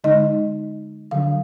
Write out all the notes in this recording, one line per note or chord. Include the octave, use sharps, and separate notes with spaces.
D3 G#3 D#4 D#5
D3 F#3 D4 F5